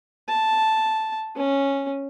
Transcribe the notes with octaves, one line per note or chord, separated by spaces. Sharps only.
A5
C#4